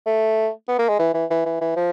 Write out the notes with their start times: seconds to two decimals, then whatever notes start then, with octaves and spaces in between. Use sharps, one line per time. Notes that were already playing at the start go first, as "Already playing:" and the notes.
0.06 A3
0.68 B3
0.79 A#3
0.89 G#3
0.99 E3
1.14 E3
1.30 E3
1.45 E3
1.61 E3
1.76 F3